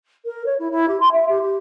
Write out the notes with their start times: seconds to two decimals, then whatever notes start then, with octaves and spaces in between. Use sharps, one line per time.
0.25 A#4
0.45 C#5
0.59 E4
0.71 E4
0.88 G4
1.00 C6
1.11 E5
1.29 G4
1.41 G4